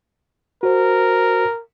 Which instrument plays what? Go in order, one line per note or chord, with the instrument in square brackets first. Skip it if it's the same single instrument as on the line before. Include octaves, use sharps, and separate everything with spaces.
[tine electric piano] F#4 C5 [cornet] A#4